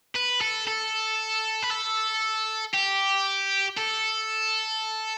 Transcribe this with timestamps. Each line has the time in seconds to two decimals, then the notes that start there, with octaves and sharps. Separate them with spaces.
0.16 B4
0.41 A4
0.67 A4
1.63 B4
1.71 A4
2.74 G4
3.77 A4